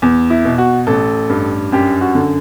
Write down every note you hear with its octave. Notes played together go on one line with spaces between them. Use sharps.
E2
E4
B2
F#4
A1 A4
G2
F#2 G4
F#4
D3